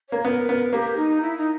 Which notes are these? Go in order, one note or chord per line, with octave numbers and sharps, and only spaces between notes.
A#3 C#5
B3 A#4
B3
A#3 G4
D#4
E4
D#4